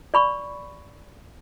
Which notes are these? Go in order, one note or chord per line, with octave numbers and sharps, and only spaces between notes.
D5 B5 C#6